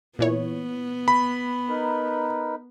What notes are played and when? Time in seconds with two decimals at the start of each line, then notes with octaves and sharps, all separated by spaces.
0.19 A#2 E3 B3 C#5
1.08 B5
1.69 D#4 A#4 B4